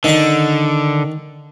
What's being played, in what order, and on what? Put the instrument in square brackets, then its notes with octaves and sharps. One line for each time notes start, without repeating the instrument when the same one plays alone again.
[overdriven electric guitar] D3 [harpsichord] D#3 D#4